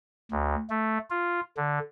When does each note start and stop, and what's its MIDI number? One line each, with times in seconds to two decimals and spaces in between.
0.32 0.55 38
0.70 0.98 57
1.10 1.40 65
1.57 1.79 50